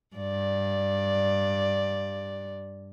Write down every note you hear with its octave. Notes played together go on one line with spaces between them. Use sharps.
G2 D5